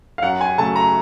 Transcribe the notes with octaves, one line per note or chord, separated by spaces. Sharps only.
F5
F#2 F#5
G#5
C#3 F#3 A3 A5
A#5